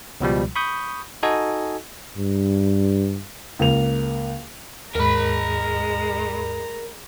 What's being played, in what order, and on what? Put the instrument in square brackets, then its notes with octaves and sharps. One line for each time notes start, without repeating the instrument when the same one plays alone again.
[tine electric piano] C#2 B2 F3 G3
B5 C#6 D#6 G6
D#4 F#4 A4 D#5 G#5
[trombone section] G2
[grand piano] C#2 A#3 F7
[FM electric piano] D#2 G#2 [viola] G#3 [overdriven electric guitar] A#4 B5 [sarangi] A#5